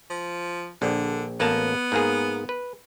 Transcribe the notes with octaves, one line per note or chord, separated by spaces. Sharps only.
F3
A#1 D3
A1 A#3 B3 A5
G#2 A#3 G#4
B4